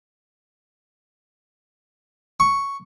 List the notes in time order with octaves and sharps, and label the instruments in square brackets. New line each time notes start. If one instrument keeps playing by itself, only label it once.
[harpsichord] C#6